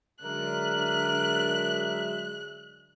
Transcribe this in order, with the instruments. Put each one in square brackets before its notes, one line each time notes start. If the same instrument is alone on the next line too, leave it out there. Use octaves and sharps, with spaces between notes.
[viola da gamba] D3 D4 [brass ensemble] F#3 G#3 E5 [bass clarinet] A#4 [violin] F#6